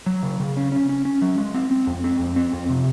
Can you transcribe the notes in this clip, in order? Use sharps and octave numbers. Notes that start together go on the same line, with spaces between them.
F#3
C#3
C#3
C#4
C#4
C#4
C#4
F#3
G#3
C4
C4
F2
C4
F2
C4
F2
C3